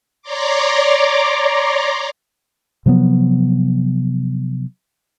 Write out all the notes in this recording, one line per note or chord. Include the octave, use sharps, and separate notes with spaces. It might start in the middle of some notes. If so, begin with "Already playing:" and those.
C#5 D5 A#5 C6 D6
C3 F3 F#3 B3